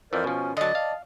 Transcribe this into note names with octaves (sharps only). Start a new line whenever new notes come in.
F2 E3 A#4 C5 D5
B2 F3 C#4
D3 F#3 D5 D#5 A5
F5